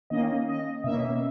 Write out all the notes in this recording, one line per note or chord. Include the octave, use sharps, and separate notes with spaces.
D#3 A#3 C#4 D#5
D#5
B2 A#3 C#4 E5